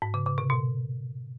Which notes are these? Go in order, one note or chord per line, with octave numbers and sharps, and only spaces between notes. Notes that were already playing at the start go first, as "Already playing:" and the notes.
G#2
C#3
C#3
C3
B2